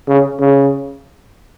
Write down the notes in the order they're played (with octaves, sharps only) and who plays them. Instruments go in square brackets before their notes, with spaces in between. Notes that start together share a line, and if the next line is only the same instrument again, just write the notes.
[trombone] C#3
C#3